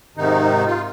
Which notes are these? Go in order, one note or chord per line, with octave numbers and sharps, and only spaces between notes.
G#2 C3 D#3 D#4
F4